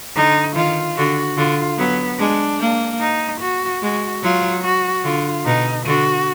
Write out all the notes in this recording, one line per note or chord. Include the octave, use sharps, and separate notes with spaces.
D3 D#4
D#3 F4
D3 F#4
D3 F4
F#3 B3
G#3 D4
A#3
D#4
F#4
G#3 F#4
F#3 F4
F#4
D3 F4
B2 D#4
D3 F#4